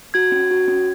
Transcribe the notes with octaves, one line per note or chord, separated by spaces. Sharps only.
F#4 G#6
C#4
F#4
C#4